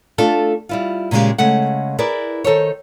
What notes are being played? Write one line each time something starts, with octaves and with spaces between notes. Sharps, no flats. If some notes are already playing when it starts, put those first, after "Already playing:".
A3 D4 F4 A4
G3 E4 F4
A#2 C#3 F#3 G#3 G4
C#3 G#3 A3 F#5
E4 G#4 A#4 B4 D5
D#3 A4 C5 C#5